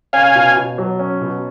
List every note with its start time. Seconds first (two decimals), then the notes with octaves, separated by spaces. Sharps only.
0.13 C#4 F5 G#5
0.35 B2
0.57 B2
0.78 F#3
0.99 C#4
1.21 B2